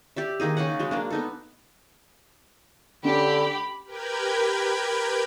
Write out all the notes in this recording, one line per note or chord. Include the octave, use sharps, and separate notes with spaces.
G4 D5 E5
D#3 A#3 D#4 G#4
C#3 D#4 G#4 F#5
F#3 G#3
G#3 A#3 D4
B3 D#4 A4
D3 C#4 G4 B5
G4 A#4 B4 G5 B5 G#6